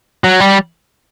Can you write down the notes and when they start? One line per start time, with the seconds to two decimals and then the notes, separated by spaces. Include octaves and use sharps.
0.24 F#3
0.40 G3